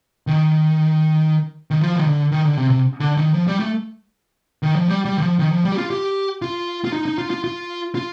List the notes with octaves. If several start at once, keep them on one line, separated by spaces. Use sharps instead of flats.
D#3
D#3
F3
D#3
D3
D#3
D3
C3
C3
D3
D#3
F3
G3
A3
D#3
F3
G3
G3
D#3
F3
D#3
F3
G3
G4
F4
G4
F4
F4
D#4
D#4
F4
F4
F4
F4